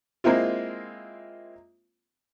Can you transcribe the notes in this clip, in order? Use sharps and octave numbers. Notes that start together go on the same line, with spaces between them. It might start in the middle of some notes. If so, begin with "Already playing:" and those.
G#3 A#3 C4 E4 F4